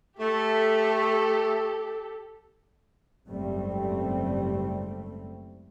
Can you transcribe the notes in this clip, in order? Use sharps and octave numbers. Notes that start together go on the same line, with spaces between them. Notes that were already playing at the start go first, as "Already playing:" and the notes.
A3 G4 A4
F#1 G#2 G3 A3 C4